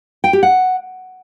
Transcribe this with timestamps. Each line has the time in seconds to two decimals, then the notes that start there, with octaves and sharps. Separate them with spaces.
0.24 G5
0.33 G4
0.43 F#5